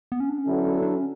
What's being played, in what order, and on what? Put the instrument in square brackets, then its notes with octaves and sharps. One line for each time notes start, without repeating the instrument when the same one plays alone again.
[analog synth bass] B3
C#4
D4
C#4
[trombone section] D3 F#3 B3 E4 A4
[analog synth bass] D4
C#4